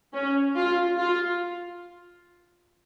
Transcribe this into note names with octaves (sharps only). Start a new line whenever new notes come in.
C#4
F4
F4